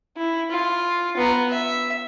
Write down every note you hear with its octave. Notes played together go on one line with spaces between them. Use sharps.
E4
F4
B3 A#5
E5